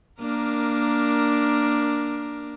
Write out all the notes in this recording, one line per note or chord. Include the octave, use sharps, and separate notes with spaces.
A#3 D4 A#4